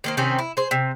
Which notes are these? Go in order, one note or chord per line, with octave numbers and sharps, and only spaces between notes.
D#3 A#3 C5
C3 D#3 C4 C#4
E4
G#4 C5
C3